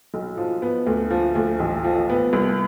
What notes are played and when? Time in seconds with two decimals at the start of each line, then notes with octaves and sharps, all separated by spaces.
0.14 B1
0.37 F3
0.62 B3
0.86 D2
1.10 F3
1.35 D2
1.59 A1
1.84 F3
2.10 B3
2.33 C2